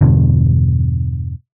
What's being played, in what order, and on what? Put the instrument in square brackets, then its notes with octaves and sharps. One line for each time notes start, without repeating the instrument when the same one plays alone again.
[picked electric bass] E2 G2 B2 D3